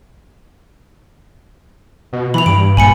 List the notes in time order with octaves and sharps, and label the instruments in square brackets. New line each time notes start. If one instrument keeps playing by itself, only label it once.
[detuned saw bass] B2
[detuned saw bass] E3 [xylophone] B5 F7
[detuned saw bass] G2 [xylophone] D7
[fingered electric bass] A#1 [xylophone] G#5 B5 C#7